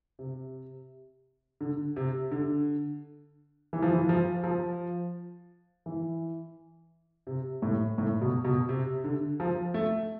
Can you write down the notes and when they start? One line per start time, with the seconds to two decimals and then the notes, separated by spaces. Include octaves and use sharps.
0.19 C3
1.61 D3
1.96 C3
2.31 D3
3.73 E3
3.82 F3
3.93 E3
4.09 F3
4.44 F3
5.86 E3
7.27 C3
7.62 A2
7.98 A2
8.21 B2
8.45 B2
8.69 C3
9.04 D3
9.40 F3
9.74 A3